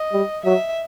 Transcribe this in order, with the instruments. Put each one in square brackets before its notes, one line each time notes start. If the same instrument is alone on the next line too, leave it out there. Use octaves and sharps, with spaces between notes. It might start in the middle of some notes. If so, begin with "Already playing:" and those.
Already playing: [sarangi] D#5
[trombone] G3
[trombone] F#3 [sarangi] E5